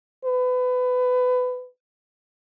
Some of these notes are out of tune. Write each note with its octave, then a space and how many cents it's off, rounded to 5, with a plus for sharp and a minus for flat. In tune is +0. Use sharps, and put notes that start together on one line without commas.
B4 +25